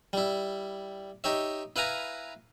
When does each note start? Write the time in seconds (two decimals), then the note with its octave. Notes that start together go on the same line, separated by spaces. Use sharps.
0.13 G3 E4
1.24 D#4 G4 C#5 E5
1.76 E4 B4 F5 G#5 A#5